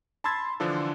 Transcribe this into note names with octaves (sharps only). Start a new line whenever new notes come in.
A5 B5 C6 E6 G#6 A6
D3 E3 F3 D4 F4 A4